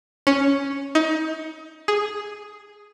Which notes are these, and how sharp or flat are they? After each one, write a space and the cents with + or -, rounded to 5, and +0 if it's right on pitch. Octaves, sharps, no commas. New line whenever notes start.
C#4 +0
D#4 +30
G#4 +0